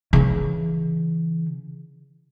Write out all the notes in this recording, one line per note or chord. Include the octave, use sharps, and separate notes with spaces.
C#3 E3